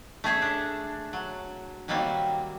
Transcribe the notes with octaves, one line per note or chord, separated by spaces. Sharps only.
A3 C#4 G#4 E5
D4
F#3
D#3 F#3 G3 A#3 C4 F4